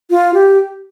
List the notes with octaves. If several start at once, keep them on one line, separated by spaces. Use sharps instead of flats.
F4
G4